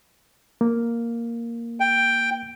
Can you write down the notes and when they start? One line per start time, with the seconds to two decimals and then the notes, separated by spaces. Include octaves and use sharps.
0.61 A#3
1.80 G5